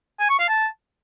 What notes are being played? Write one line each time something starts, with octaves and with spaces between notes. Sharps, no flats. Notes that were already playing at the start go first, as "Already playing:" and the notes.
G#5
C#6
F5
A5